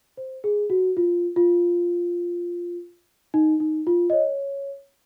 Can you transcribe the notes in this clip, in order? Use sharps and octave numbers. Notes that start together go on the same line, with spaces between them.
C5
G#4
F#4
F4
F4
D#4
D#4
F4
D#5
C#5